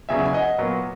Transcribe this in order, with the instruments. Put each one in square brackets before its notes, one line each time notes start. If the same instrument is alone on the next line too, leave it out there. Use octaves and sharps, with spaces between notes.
[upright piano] E1 E2 C#3 F#3 [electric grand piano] E5 G#5
[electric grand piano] G#5
D#5 F#5
[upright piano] A#2 F#3 B3